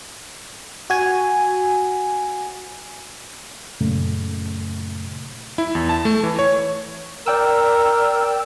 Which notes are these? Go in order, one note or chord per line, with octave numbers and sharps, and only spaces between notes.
F#4 G#5
F#2 A#2 C#3 A3
E4
E2
A5
A3
E3
C#5
A#4 D5 G5 E6